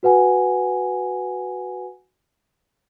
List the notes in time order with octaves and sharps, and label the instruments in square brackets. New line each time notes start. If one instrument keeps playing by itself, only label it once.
[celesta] F#4 B4 F#5 G#5